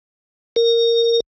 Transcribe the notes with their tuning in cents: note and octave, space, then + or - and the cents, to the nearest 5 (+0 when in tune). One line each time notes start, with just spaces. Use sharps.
A#4 -10